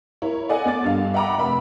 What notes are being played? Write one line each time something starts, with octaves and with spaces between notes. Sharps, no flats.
E4 A#4 C#5
A4 D5 D#5 F#5 G#5
B3 D6 A6
G2 F5
E5 F#5 G5 A#5 B5 D6
F1 E5 B5